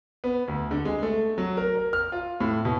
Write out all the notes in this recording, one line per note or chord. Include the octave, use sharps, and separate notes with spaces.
B3
D2
D3
G#3
A3
F#3
A#4
A#4
F6
F4
A2
B2